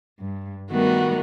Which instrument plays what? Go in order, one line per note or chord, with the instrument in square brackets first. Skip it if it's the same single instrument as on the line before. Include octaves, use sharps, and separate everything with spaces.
[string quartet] G2
D#3 G3 A3 B3 F#4 A#4